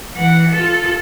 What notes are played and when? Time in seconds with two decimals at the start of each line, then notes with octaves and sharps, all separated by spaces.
0.12 E3 F#5
0.51 F4 A4